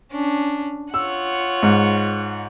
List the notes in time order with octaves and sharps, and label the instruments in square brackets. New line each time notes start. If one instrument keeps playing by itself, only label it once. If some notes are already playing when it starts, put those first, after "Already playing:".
[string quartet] C#4 D4
[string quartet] F4 C#5 F#5 [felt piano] E6
[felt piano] G#2